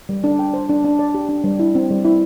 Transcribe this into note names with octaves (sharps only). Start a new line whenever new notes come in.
G3
D4
G5
C5
D4
D4
D5
G4
D4
G3
E4
C4
G3
E4